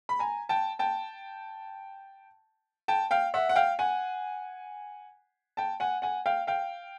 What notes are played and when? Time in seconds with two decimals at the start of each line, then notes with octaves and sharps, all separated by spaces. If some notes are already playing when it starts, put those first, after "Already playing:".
0.09 B5
0.19 G#5 A#5
0.49 G5 A5
0.79 G5 A5
2.88 G5 A5
3.11 F5 G5
3.34 E5 F#5
3.49 F#5
3.56 F5 G5
3.79 F#5 G#5
5.57 G5 A5
5.80 F#5 G#5
6.02 F#5 G#5
6.26 F5 G5
6.47 F5 G5